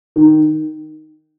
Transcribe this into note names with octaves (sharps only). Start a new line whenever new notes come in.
D#3